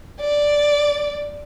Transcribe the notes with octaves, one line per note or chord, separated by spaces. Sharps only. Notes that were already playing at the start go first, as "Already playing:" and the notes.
D5